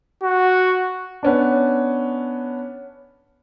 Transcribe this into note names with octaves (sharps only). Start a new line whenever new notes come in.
F#4
B3 C#4 D4